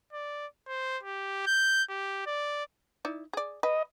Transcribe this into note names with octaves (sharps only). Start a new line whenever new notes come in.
D5
C5
G4
G6
G4
D5
D#4 E4 D5
G#4 D5
B4 D#5